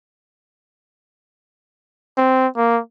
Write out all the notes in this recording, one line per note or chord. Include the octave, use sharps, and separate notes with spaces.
C4
A#3